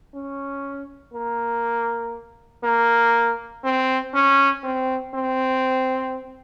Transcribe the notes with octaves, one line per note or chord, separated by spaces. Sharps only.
C#4
A#3
A#3
C4
C#4
C4
C4